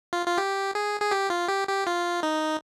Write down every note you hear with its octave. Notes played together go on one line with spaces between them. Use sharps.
F4
F4
G4
G#4
G#4
G4
F4
G4
G4
F4
D#4